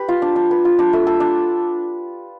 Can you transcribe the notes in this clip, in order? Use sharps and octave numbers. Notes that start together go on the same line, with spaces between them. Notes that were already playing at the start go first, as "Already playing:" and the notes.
Already playing: G4 B4
F4
D4
D4
B4
F4
D4
A3
A4
D4